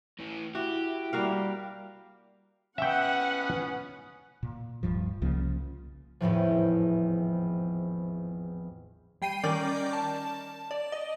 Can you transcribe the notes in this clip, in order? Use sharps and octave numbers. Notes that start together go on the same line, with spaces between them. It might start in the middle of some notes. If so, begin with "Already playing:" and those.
A2 E3
E4 F#4 G4
G3 A#3 F#4 F5
B3 C#4 E5 F#5 G5
A#2
D1 G2 F3
C2 C#3 F3 A#3
G#1 E2 A2 F3
G3 G5 C7 D#7
D#3 C#4 A#4 D5 D6 G6
A5
D5
D#5